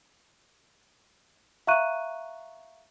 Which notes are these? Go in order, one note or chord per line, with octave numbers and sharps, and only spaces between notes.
E5 F5 A#5 C#6 F#6 D#7